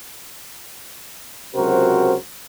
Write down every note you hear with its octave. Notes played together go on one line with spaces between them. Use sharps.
C#2 C3 F#3 F#4 A#4 C5